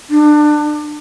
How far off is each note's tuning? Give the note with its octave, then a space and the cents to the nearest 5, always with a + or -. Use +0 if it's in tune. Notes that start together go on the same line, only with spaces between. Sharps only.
D4 +25